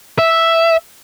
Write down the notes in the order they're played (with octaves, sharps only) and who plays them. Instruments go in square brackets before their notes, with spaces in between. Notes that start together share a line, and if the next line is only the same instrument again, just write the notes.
[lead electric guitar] E5